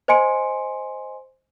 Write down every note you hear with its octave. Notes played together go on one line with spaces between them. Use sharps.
C5 D#5 G#5 C6 C#7 D7